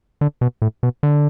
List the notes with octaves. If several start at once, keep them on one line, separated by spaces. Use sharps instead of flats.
D3
B2
A2
B2
D3